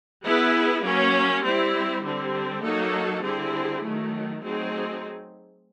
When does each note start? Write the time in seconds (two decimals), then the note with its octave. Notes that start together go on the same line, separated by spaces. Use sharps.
0.23 B3 E4 G#4 B4
0.84 F#3 A#3 C#4
1.43 G3 C4 E4
2.04 D3 G3 C4
2.63 F#3 A#3 D#4 F#4 A4
3.23 D3 G3 C4 E4 G#4
3.83 D#3 F#3 A3
4.43 F#3 A3 C4 D#4 G#4